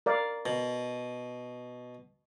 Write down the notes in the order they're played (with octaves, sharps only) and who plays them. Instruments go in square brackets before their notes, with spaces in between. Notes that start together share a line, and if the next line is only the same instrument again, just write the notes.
[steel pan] A#4 D5 F5
[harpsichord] B2